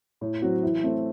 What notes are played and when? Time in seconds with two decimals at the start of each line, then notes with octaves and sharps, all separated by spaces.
0.21 A2
0.42 F#3 C4 F#4
0.63 E3
0.83 A3 C4